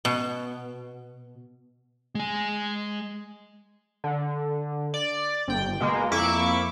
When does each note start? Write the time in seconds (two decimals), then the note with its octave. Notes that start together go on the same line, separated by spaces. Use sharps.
0.05 B2
2.15 G#3 G#5
4.04 D3
4.94 D5
5.48 G1 G5
5.81 B2 G#3 A#3
6.11 F2 A#3 E4 C#6 D6 E6